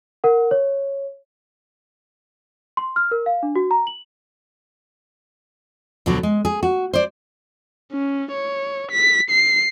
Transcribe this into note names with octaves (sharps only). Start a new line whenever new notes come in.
A#4 F#5
C#5
C6
F6
A#4
F5
D4
F#4
A#5
F#7
D2 B2 D3 F#3
G#3
G#4
F#4
C5 D5
C#4
C#5
B6
C7